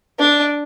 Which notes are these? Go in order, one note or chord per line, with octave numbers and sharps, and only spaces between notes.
D4